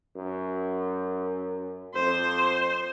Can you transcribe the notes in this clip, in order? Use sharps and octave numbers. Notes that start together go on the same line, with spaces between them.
F#2
F2 C5